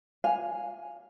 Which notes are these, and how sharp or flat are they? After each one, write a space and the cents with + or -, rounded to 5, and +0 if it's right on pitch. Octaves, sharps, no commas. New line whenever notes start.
F5 +0 G#5 +0